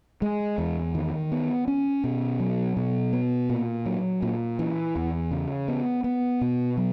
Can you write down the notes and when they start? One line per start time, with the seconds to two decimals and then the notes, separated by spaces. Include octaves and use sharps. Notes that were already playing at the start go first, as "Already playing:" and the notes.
0.22 G#3
0.58 E2
0.95 D#3
1.32 B3
1.68 C#4
2.04 B2
2.40 F#3
2.77 B2
3.13 B3
3.49 A#2
3.86 F#3
4.22 A#2
4.59 E3
4.96 E2
5.31 C#3
5.68 B3
6.04 B3
6.41 B2
6.77 F#3